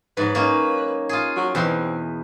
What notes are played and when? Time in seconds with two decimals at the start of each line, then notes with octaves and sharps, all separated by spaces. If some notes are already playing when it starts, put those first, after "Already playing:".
0.17 G#2 F#3 B4
0.35 A#3 C#4 D#4
1.09 F4 G#4
1.36 F#3
1.55 E2 B2 C4 C6